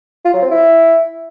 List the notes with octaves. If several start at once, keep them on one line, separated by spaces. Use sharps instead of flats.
F4
F#3
C4
E4